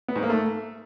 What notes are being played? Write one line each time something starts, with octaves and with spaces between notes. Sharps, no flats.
B3
G#2
A#3
A3